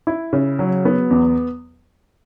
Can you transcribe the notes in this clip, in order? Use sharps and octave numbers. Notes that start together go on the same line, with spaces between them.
E4
C#3
F#3
B3
E2